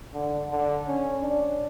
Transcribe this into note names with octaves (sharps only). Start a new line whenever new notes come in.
D3
D3
C#4
D4